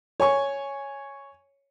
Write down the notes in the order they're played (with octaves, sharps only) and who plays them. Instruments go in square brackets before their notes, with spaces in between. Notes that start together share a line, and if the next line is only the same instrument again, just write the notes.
[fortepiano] C#5 G#5 C#6